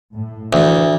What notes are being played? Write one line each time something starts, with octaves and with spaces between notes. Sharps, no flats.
A2
D2 E3